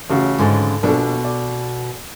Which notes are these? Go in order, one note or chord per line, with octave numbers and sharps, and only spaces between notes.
A1 C#3 F#4
G#2 D3
A#1 B2 D4 A4
D5